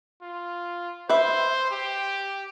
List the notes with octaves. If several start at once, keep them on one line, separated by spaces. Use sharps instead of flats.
F4
B4 C5 E5
G4